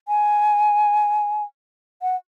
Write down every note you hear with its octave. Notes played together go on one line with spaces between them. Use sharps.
G#5
F#5